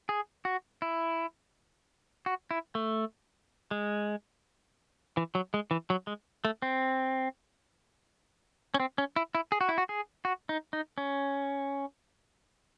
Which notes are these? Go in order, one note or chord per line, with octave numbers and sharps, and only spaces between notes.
G#4
F#4
E4
F#4
E4
A3
G#3
E3
F#3
G#3
E3
F#3
G#3
A3
C4
C#4
C4
C#4
E4
E4
G#4
F#4
E4
F#4
G#4
F#4
D#4
D#4
C#4